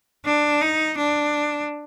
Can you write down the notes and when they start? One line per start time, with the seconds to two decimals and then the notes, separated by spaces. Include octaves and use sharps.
0.25 D4
0.61 D#4
0.98 D4